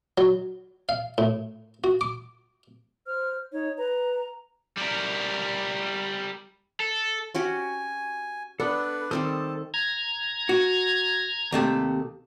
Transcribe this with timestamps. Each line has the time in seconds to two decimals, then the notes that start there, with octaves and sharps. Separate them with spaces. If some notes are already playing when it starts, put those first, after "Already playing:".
0.18 F#3
0.89 F5
1.18 A2
1.84 F#4
2.01 D6
3.07 C5 F6
3.52 D#4 C#5
3.78 B4 A#5
4.77 G3 A#4
6.80 A4
7.35 C#4 F#4 G4 G#5
8.60 B3 D4 A4 B4 D5 B5
9.11 D#3 G3 C4 A4 A5 D6 D#6
9.74 A#5 G#6
10.49 F#4
11.52 D#2 C3 A3